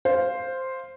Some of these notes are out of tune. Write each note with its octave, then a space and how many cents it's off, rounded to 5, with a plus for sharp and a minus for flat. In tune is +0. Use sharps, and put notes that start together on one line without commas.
C5 +0 F5 +0